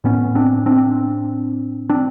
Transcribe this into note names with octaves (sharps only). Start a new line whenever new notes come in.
A2 B3 C#4
C4 D4
C4 D4
C4 D4